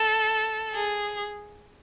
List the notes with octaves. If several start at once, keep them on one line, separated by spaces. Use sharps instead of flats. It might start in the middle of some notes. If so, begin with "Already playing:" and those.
Already playing: A4
G#4